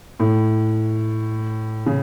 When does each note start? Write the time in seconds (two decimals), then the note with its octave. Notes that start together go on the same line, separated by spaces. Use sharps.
0.19 A2
1.86 C#3